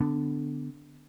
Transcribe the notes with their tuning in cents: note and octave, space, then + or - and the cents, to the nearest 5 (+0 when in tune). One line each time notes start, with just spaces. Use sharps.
D3 +0 B3 +25 D4 +0